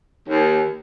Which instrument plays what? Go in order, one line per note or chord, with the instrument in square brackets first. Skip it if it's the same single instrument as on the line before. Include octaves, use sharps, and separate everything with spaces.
[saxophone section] D#2